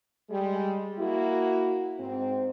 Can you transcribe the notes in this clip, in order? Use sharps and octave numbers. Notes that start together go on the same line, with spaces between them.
G3 G#3
A#3 E4 F#4
G#2 C4